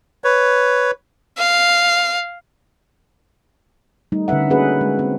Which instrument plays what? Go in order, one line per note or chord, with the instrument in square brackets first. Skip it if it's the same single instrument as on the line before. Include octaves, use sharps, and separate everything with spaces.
[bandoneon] B4 C#5
[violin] F5
[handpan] G3 A3 D#4
D3 C#4 B4 E5 F#5
A#3 C#4 F#4 G#4 B4 F#5
G#3
C4